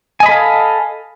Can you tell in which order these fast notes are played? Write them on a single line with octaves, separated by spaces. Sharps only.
G#5 D#5 B5 A4 F5